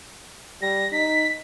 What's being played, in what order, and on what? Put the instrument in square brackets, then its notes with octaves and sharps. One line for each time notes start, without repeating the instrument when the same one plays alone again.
[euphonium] G3 [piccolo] A#6
[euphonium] D#4 [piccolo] B6